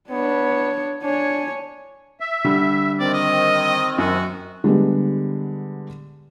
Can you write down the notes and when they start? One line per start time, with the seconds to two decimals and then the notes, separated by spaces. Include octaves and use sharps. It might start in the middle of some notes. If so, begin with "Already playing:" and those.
0.10 B3 D4 C#5
1.04 D4 C#5 G#5
2.20 E5
2.45 D3 G3
3.00 D#3 C4 D5
3.14 D#5
3.98 F#2 F#4
4.64 D3 G3 G#3 B3